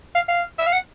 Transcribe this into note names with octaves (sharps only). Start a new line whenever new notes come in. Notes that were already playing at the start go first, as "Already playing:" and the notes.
F5
F5
E5
F5
F#5